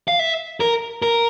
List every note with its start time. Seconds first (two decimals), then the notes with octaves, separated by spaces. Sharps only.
0.08 F5
0.19 E5
0.60 A#4
1.02 A#4